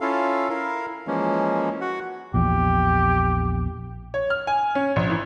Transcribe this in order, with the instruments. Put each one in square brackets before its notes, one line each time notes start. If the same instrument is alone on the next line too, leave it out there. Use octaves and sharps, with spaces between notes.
[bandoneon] C#4 E4 F4 A4 F5
E4 A#4 F5
E3 F3 G#3 A#3 C#4
F#4 F#5
[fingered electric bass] A#1 E2 [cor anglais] G4
[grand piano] C#5
F6
G#5
C#4
A#1
E3